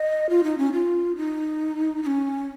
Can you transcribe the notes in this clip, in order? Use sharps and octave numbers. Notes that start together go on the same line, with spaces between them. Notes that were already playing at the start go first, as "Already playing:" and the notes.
Already playing: D#5
F4
D#4
C#4
F4
D#4
D#4
C#4